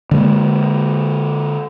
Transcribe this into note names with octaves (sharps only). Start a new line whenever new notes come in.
D3 G#3 A#3